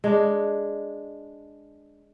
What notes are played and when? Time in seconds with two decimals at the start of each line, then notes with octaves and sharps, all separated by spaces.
0.04 G#3 D4